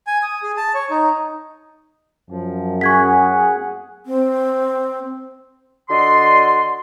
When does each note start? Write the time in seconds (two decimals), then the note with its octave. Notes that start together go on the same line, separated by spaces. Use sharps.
0.07 G#5
0.23 D#6
0.43 G#4
0.57 A5
0.75 C#5
0.90 D#4
2.30 F#2 F3
2.81 G#4 F#5 C#6 G#6 B6
4.06 C4
5.89 D3 F#4 D5 D#5 C6